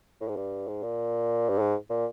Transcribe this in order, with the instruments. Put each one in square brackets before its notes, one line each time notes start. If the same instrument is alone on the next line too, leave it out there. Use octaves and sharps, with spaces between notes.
[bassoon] A2
G#2
G2
G#2
A#2
G2
G#2
A#2